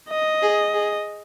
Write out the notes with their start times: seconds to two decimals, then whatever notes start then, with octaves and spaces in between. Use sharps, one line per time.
0.10 D#5
0.42 G#4
0.73 G#4